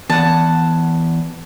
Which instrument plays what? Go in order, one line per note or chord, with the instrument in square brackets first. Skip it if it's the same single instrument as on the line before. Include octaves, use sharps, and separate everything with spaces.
[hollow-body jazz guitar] E2 [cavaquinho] F#5 A5